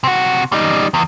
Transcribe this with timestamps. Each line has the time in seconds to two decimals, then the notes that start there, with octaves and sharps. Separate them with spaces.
0.04 C3 F#4
0.52 G3 D#4
0.94 E2